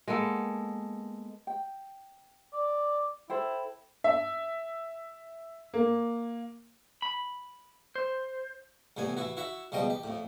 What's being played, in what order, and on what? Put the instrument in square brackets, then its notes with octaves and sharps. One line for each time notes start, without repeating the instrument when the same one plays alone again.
[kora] G#3 A#3 B3 A4
[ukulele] G5
[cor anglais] D5
[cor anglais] E4 [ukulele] A4 C5 G5
[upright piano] E5
A#3
[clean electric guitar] B5
C5
[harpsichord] C2 A2 E3 B3 G#5
E3 E4 F#4
E4 F#4 E5
C#2 B2 F3 G3 D#5 G5
G4
F2 A2